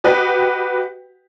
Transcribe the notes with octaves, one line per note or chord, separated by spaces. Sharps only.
F#4 G4 B4 D#5 F#5 G5